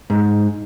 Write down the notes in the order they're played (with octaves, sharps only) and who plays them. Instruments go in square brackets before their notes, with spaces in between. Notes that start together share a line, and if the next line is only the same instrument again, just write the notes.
[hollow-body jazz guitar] G#2